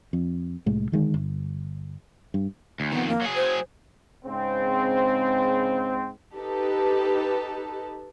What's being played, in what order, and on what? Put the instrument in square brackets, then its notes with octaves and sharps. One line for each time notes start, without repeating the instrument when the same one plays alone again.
[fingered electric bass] F2
C2 A2 G#3
D3 D#3 G#3
G1
G2
[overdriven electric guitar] D2
[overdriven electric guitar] F2 D#3 [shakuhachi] B3
[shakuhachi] A#3
[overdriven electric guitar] F#3 G#4
[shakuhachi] C5
[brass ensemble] G#2 C#3 C4
[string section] D#4 G4 A4 B4 A5